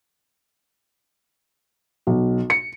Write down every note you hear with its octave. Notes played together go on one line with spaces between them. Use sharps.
B1
C#7